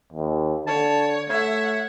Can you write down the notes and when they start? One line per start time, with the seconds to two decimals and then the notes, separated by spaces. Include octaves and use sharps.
0.13 D#2
0.67 D3 C#5 A5
1.29 A3 C#5 E5 F#5